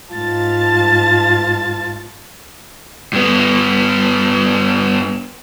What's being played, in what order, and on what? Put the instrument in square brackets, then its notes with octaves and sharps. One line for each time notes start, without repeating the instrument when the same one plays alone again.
[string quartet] G#2 F4 A5 A6
[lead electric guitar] G2 B3